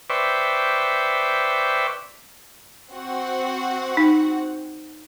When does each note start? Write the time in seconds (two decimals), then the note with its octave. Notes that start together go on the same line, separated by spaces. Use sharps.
0.10 B4 C5 D5 E5 G5 C#6
2.92 C4 F#4 F#5
3.97 D#4